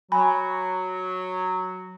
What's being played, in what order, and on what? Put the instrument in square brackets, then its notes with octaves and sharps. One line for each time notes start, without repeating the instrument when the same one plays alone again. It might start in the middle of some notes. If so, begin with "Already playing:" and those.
[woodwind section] F#3 F#4 [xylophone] G#5 B5